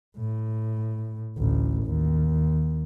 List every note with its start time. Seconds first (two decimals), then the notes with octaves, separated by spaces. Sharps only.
0.17 A2
1.38 A1 D2
1.83 D#2